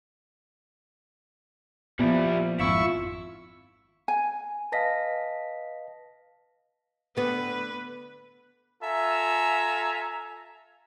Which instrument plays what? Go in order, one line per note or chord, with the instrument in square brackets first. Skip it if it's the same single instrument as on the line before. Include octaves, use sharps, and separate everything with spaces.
[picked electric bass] A#2 F3 [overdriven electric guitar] G3 E4 [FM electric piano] B3
[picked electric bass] G#1 F2 [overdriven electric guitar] E4 [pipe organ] F4 C#6 E6
[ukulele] G#5
[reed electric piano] B4 D#5 F5 [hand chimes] A5 A#6 B6
[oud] D3 B3 [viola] B4
[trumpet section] F4 A4 E5 G#5 A#5